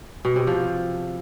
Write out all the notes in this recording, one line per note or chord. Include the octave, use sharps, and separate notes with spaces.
B2
C3
F3